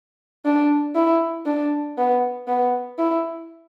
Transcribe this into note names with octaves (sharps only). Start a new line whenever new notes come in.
D4
E4
D4
B3
B3
E4